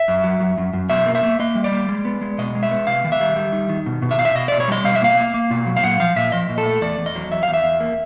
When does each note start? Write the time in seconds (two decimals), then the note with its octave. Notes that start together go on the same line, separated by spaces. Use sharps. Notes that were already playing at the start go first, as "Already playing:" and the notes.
Already playing: E5
0.08 F#2
0.24 F#3
0.41 F#2
0.58 F#2
0.73 F#2
0.90 B2 E5
1.06 A#3
1.15 E5
1.23 A#3
1.39 A#3 D#5
1.55 G3
1.64 D5
1.72 A#3
1.89 G#3
2.05 B3
2.21 G#3
2.38 B2 D#5
2.55 G#3
2.63 E5
2.71 B3
2.87 C3 F5
3.04 D#3
3.12 E5
3.21 G3
3.36 G3
3.53 D#3
3.69 D#3
3.86 B2
4.02 B2
4.11 E5
4.18 B2 F5
4.25 E5
4.35 B2 D#5
4.48 B2 D5
4.60 C#5
4.68 G3 D#5
4.85 B2 F5
4.95 E5
5.01 A#3 F5
5.17 A#3
5.34 A#3
5.50 B2
5.67 F#3
5.77 F5
5.84 A#2 F#5
6.00 F3 F5
6.16 A#2 E5
6.32 F3 D#5
6.49 A#2
6.58 A4
6.66 A3
6.81 E2 D5
6.98 E2
7.06 D#5
7.15 F#3
7.31 E2 E5
7.43 E2 F5
7.54 E5
7.64 E2
7.80 A#3